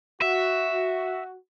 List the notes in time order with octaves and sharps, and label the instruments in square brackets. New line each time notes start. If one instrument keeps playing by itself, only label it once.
[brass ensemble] F#4 [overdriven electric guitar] E5